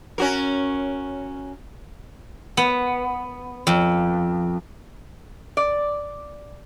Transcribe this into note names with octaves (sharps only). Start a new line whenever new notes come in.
C#4 F#4 A#4
B3
F2
D5